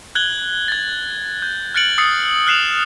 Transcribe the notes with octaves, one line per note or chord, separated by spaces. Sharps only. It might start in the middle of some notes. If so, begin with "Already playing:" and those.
F#6 G#6 F#7 G7
G#6 A6
G6
F6 F#6 A6 C#7 D7 F#7
D#6 E6 A6 C7 C#7
F6 F#6 C7 E7 F7